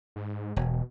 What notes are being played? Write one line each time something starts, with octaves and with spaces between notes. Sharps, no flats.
G#2
E1 B2